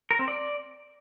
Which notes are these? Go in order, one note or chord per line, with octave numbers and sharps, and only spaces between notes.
A#4
C4
D5